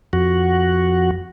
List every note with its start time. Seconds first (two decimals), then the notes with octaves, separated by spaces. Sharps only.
0.13 F2 F#4